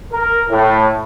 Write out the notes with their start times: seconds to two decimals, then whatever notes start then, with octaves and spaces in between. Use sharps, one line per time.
0.12 A#4
0.49 A2